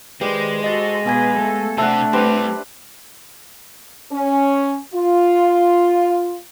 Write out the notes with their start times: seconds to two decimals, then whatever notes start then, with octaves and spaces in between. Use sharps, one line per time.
0.21 D#3 G#3 G4 B4 C5 D5
0.64 F#4 A4 C5 D#5 A6
1.06 B2 B3 G#4 B4 G#5 G#6
1.37 A3 A4
1.78 C3 A3 D4 C5 E5 F#5 A5
2.13 G3 C4 G4 B4 C5
4.12 C#4
4.95 F4